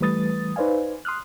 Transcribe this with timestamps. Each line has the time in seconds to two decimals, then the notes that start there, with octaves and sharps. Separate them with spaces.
0.01 E3 G3 A3 B4 D#6 A6
0.56 D#4 B4 C5 D5 F5 G#5
1.05 C6 D#6 F6 F#6